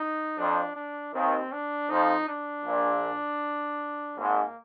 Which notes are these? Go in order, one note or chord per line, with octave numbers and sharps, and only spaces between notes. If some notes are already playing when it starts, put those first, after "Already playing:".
Already playing: D#4
F2 F3 D4
D4
D#2 D#3 C4
D4
F2 F3 D#4
D4
A#1 A#2
G#1 G#2 A#3